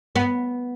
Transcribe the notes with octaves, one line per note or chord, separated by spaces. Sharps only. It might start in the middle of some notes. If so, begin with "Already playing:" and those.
B3